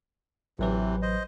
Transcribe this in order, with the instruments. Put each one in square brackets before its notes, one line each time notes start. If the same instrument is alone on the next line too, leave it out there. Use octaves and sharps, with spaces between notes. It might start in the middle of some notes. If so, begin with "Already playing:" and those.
[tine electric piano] A1 F#3 B4 [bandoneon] C3 E3
[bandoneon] C5 D#5